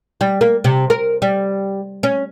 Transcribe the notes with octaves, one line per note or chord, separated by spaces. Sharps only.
G3
A#3
C3
A#4
G3
C#4